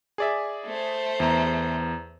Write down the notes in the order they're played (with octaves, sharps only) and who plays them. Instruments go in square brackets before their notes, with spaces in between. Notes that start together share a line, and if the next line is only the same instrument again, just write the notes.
[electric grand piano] G#4 D5 E5
[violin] A3 C5
[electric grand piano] E2 A#5